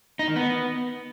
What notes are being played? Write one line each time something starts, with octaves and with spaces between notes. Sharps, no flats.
D#4
D#3
B3